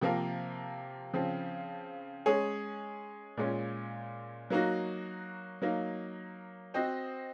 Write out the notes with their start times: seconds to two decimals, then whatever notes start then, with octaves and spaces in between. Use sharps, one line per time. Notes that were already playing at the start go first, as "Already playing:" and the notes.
0.01 C3 F3 A#3 F4 A#4
1.14 C#3 F3 C4
2.26 G#3 C#4 G#4 C#5
3.37 A#2 G#3 C#4 F4
4.50 F#3 A#3 D#4 F#4
5.62 F#3 A#3 D#4
6.74 C4 F#4 C5 D#5